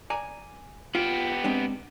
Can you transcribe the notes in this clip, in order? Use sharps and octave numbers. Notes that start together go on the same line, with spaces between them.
D5 G#5 A#5
B3 F4 G4
G#3 C4 D4